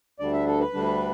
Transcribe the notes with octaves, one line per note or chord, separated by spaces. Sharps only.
D2 D3 G3 D4 D5
E5
A4
B4
D2 D3 G3 D4